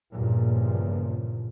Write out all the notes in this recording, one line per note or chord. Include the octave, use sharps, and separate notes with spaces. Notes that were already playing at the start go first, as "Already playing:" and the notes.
E2 G2 A#2 C#3 F3